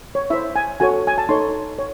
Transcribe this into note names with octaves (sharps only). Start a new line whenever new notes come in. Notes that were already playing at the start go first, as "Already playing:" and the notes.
C#5
E4 C5 E5
G#5
F#4 A4 C#5 G#5
G#5
A5
D#4 A4 C#5 C6
C#5